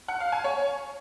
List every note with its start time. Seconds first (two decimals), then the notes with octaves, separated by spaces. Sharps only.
0.08 F#5
0.20 F5
0.32 G#5
0.44 C#5